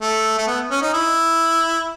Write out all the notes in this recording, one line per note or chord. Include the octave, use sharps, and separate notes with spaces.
A3
A3
B3
C#4
D#4
E4